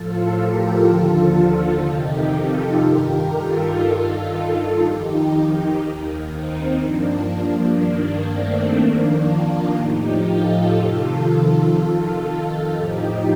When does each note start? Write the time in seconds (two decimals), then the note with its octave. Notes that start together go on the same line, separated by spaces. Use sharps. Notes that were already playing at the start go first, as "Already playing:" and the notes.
Already playing: A2 F3 F4 A4
0.37 G4 A#4
0.86 D#2 D3 F3 F4 A4
1.85 F2 C3 D#3 D#4 G4
2.34 F4 A4
2.83 G2 D#3 G4 A#4
3.33 F4 A4
3.83 G2 D#3
4.81 F2 D#3 D#4 G4
5.80 D#2 D#3
6.30 C4 D#4
6.79 G2 F3 A#3 D4
7.29 A#3 D4
7.78 G2 D#3 A#3 D4
8.27 A3 C4
8.77 F2 D#3 A#3 D4
9.26 D4 F4
9.75 A2 F3 D#4 G4
10.26 F4 A4
10.74 F2 C3 D#3
11.24 F4 A4
11.74 F2 D#3
12.72 A2 F3 D#4 G4